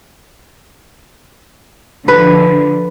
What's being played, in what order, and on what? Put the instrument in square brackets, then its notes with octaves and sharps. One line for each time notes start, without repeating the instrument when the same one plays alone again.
[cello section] D3 F3 [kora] B4